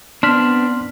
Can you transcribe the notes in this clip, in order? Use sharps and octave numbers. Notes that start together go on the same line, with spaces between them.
B3 C4 D4 C6 F6 B6